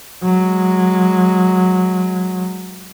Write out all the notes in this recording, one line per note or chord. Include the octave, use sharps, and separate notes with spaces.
F#3 G#3